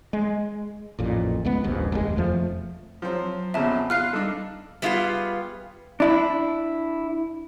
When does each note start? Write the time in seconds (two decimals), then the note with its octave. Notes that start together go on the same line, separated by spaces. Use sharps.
0.13 G#3
0.99 A1 F2 A#2
1.45 C#2 G#3 B3
1.64 D#1 A#1 D#2 G#2
1.92 F1 D#2 G#3
2.16 E1 F2 F3 A3
3.02 F3 F#3 C4
3.54 F2 A#2 C#3 B3 E5 A5
3.90 F4 F5 F6 F#6 C7
4.13 G3 D4 D#4 A4
4.82 G3 B3 E4 F4 G#4 F5
6.00 D4 E4